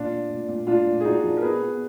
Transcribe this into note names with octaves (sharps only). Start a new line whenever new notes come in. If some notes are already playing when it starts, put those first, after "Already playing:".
Already playing: A#2 D4 F4
A#2
A#2
A#2
A#2 D4 F4
A#2
G#4
A#2 D#4 F#4
F3
A#4
B3 G#4 B4
B3